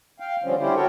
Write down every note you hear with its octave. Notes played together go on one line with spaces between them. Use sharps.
F5 G5
D3 F3 G3 C4 C#4
D3 G3 C#4 E4 G4 C5
F#4 A4 A#4 C#5 G5